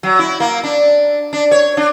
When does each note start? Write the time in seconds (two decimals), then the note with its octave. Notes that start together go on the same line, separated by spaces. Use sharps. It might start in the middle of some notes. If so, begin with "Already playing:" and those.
0.03 F#3
0.19 E4
0.40 A#3
0.64 D4
1.33 D4
1.51 C#5
1.77 D4